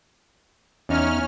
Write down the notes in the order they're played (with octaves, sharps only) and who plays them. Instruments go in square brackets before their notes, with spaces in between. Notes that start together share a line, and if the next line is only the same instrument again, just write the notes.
[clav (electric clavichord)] E2 D#4 [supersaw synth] C#4 F6